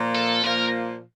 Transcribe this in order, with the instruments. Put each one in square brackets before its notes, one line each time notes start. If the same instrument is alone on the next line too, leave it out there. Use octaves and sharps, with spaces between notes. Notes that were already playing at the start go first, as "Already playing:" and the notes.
Already playing: [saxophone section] A#2 F3 A#3
[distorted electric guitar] A4
[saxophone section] A#2 F3 A#3 [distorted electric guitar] A#4